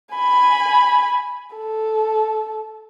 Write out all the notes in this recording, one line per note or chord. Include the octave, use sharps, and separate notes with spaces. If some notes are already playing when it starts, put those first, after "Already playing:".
G#5 B5
A4